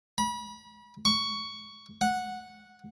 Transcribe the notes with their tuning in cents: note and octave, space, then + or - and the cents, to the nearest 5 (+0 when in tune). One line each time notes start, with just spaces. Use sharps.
B5 -35
C#6 +10
F#5 -10